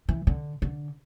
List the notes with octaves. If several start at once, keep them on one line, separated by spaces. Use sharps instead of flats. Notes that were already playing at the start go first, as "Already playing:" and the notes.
E3
D3
D3